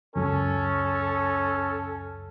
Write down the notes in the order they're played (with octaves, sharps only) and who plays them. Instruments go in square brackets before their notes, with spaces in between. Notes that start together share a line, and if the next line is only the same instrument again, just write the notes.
[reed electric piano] C#2 F#2 [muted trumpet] C#4 [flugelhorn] A4